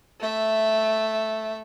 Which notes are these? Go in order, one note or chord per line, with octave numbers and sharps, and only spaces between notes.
A3 E5